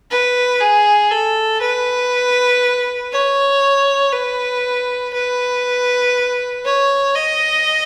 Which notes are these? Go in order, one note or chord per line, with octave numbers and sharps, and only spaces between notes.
B4
G#4
A4
B4
C#5
B4
B4
C#5
D#5